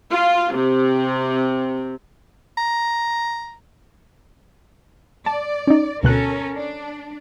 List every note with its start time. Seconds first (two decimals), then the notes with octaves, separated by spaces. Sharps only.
0.12 F4
0.55 C3
2.58 A#5
5.26 D5 A5
5.67 C#4 D#4
6.03 D2 B2 C#4 A4 A#4 F#6
6.55 D4